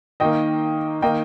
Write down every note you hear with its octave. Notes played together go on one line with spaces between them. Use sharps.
D#3 A#3 D#5 G5
D#3 A#3 D#5 G5